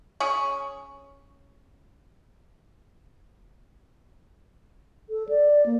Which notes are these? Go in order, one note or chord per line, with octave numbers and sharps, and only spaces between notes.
C#4 G#4 C#5
A4
D5
A#3